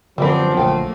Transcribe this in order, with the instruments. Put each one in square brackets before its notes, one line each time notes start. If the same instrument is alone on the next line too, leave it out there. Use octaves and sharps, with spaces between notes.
[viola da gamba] F#2 C4 D4 [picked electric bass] D3 G#3 [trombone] F3 [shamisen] G3 B4
[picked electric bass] A#1 D3 [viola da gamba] A3 A#3 [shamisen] F5 G5